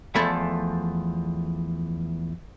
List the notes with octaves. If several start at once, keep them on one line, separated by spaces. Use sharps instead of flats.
E2 F3 A3 A4 G#5 B5